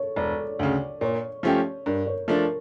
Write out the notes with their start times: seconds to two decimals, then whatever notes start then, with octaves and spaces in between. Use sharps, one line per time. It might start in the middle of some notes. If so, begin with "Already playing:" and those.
Already playing: A4 C#5
0.16 E1 D5
0.59 D2 C#3
1.01 A#2 C#5
1.43 F3 A3 C#4 G4
1.86 G2 A#4
2.07 C#5
2.28 F3 A3 D4 A#4